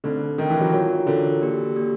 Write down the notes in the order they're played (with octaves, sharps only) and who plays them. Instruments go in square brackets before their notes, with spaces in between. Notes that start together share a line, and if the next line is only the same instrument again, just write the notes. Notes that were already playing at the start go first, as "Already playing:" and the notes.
[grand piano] D3 [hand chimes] A3 C4 D#4
[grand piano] D#3 [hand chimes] A3 C4 D#4
[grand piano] E3
F#3
[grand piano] F#3 [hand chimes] F4 A#4 C#5
[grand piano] D3 [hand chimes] F4 A#4 C#5
[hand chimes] A#3 D4 G4
A#3 D4 G4